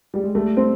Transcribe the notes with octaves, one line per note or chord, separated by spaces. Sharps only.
G3
G#3
G3 A3
C4